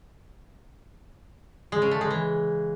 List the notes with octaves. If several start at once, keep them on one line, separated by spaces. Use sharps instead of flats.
G#3
C#3
A3
G#3
E3